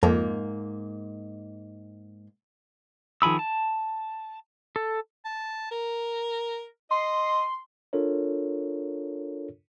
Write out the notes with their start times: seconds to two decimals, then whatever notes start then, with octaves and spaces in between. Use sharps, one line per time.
0.03 F2 G#2 A#3
3.22 D#3 F3 G#4 B5 E6
3.39 A5
4.76 A4
5.25 A5
5.72 A#4
6.91 D#5 C6
7.93 D4 F4 A4 A#4 C#5